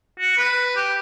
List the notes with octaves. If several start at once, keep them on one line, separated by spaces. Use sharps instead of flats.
F#4
B4
G4